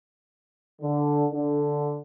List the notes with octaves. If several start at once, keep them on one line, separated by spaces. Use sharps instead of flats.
D3
D3